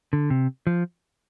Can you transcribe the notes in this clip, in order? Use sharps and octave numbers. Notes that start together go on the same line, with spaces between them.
D3
C3
F3